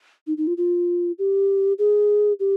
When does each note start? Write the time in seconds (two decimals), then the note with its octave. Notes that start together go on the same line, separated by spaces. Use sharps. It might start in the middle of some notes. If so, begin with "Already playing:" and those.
0.27 D#4
0.37 D#4
0.47 F4
0.57 F4
1.19 G4
1.78 G#4
2.40 G4